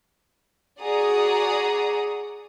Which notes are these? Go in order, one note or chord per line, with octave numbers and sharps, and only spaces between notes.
F#4 G#4 D5 F#5 A#5 D#6